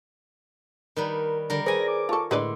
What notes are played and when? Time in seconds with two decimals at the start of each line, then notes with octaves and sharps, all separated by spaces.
0.96 D#3 G3 A#4 B4
1.50 D3 G3 A#4
1.66 G#4 B4 C5 D5 G#5 A#6
1.88 D6
2.09 F4 A4 A5 C#6
2.31 A2 D3 G#3 B4 D5 C6